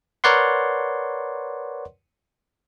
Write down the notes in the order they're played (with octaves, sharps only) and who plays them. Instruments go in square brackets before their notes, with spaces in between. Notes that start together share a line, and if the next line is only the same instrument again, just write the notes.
[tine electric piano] A#4 B4 C#5 D5 F#5 C6